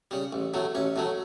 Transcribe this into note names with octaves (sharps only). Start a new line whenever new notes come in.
C#3 G3
A1
A2 F#3 A3
A1 C#4
A2 F#3 A3